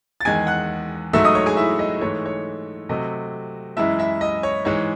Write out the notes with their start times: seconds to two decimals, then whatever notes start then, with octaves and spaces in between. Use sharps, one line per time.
0.21 A6
0.25 E2 D#3 G#3 G#5 G#6
0.47 F#5 F#6
1.13 G#2 F#3 A3 E5 E6
1.24 D#5 D#6
1.35 C#5 C#6
1.46 G#4 G#5
1.57 E4 E5
1.79 D#5
2.01 G#2 E3 A3 C#5
2.26 C#5
2.89 C3 F#3 A3 D#5
3.77 F#2 E3 G#3 E4 E5
3.99 E4 E5
4.21 D#5
4.43 C#5
4.65 G#2 E3 G#3 C#5